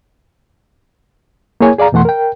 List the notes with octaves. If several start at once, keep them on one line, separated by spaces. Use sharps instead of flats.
A#3 E4 G#4 C#5 G#5
G#4 D5 F5 A#5
F2 B2 E3 A3 F#5 C6
A#4 G5